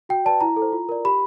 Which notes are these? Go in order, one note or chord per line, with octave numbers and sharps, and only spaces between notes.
F#4 G5
B4 D5 A5
E4 A#5
A4
C5
F4
A#4 D5
G4 B5